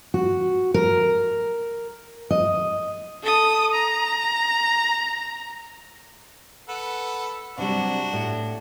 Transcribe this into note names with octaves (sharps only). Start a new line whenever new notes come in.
F#4
A#4
D#5
A4 D#6
A#5
A4 B4 F#5
C3 F#3 G3 D4 F#4
A2